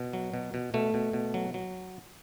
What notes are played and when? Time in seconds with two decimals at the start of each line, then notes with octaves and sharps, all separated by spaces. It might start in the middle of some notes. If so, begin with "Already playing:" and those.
Already playing: B2
0.13 F#3
0.34 B2
0.54 B2
0.74 B2 A3
0.94 B2
1.13 B2
1.34 F#3
1.54 F#3